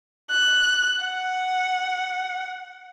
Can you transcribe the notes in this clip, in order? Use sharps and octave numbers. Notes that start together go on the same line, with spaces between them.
F#6
F#5